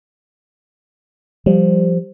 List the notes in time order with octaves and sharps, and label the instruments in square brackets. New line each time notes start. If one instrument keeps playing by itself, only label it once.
[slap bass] F3 [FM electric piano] G3